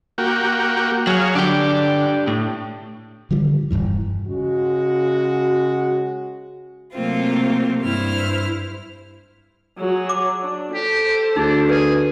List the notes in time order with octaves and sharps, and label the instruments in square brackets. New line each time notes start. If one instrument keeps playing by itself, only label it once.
[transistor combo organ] A#3 F#4 G4
[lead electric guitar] F#3 [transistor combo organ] G#4 C#5 F5
[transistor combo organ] D3 [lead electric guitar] D4 G4
[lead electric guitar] A2
[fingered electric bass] D3 D#3 F3 G3
E1 B1 G2 E3
[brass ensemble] C#3 G#3 F#4
[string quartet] C3 F#3 A3 A#3 C4 F4
G2 E4 C5 F6
[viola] F#3 G#4
[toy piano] D6
[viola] D4
[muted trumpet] G4 [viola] A4 C5
[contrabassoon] D2 [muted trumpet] D4 [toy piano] D#4 G#4
[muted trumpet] G#4 [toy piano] B4